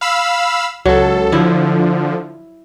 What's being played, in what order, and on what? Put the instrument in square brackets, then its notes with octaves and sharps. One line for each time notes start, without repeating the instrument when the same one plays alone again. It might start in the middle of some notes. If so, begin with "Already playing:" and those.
[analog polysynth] F5 B5 E6
[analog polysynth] C#2 A4 [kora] F#3
[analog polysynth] D3 F3 [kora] E4